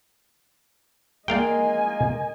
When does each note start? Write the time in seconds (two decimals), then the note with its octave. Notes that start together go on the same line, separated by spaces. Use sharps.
1.28 G#3 A#3 D5 D#5 F5 G5 G#5